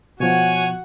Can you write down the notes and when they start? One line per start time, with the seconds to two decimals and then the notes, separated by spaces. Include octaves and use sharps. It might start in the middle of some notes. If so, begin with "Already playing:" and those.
0.20 B2 F3 F#4 C#5 F#5 G#5